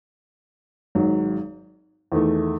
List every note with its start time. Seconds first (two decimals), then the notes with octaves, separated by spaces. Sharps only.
0.95 G#1 G#2 F#3
2.12 E2 D#3 A3